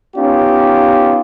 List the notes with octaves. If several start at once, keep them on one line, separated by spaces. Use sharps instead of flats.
B3 C#4 D#4 F4 G4